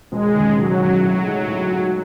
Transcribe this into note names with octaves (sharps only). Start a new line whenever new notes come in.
E1 G#3
D#2 C#3
E1 F#3
D#2 C#3
A2 F#3
G#3 D#4
A2
G#3 D#4